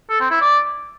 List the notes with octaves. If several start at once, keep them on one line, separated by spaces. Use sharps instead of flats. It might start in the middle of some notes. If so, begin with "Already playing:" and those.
A4
C4
E4
D5